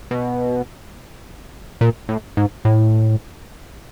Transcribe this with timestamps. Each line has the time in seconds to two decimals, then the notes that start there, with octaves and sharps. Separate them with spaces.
0.11 B2
1.81 A#2
2.09 A2
2.37 G#2
2.65 A2